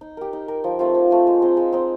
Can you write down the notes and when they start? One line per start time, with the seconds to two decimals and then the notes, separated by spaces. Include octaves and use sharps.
0.01 D#4
0.17 G4 A#4
0.33 D#4
0.48 G4 A#4
0.64 F3
0.79 A3 C4 F4
0.95 F3
1.11 A3 C4 F4
1.27 G#3
1.42 C4 D#4 G#4
1.57 G#3
1.72 C4 D#4 G#4